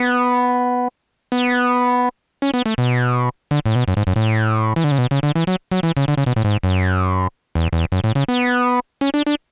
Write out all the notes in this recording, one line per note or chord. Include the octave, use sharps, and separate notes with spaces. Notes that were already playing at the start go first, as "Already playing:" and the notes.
Already playing: B3
B3
C#4
B3
A3
B2
D3
A2
B2
F#2
G#2
F#2
A2
E3
D3
C#3
B2
C#3
D3
E3
F#3
F#3
E3
C#3
D3
C#3
B2
A2
G#2
F#2
E2
E2
F#2
A2
C#3
B3
C#4
D4
D4